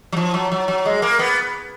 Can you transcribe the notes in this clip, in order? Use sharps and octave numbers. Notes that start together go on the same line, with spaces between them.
F#3
F3
F#3
F#3
F#3
G#3
A#3
B3